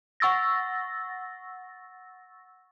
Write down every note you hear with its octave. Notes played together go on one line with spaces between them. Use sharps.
F#5 C#6 E6 A6 A#6